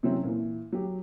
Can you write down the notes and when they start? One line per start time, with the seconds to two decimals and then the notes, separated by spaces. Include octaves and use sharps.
0.03 C3 E3 F#3 A3 C4 C#4
0.23 A#2 E3
0.72 F#3 G4